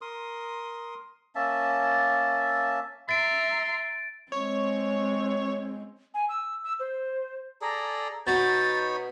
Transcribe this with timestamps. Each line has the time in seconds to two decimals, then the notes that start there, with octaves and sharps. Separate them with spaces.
0.01 A#4 C6 D#6
1.35 A#3 C#4 E5 A5
3.09 E5 A#5 C6 A6 D7
4.32 G#3 C4 C#5
6.14 G#5
6.29 E6
6.64 E6
6.80 C5
7.62 G#4 A4 D5 A#5
8.27 B2 D#4 C#5 A#5 B5 G6 A6